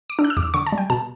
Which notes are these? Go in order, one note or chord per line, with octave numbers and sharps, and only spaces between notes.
D6
D4 E6
F#6
E6
E2 D6
E6
D3 C#6
A5
G3
G5
B2 A5